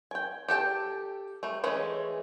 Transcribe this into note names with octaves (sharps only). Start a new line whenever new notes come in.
G5 G#5
G4 A4 G5 A5
G3 A3
E3 G#3 A3 C#4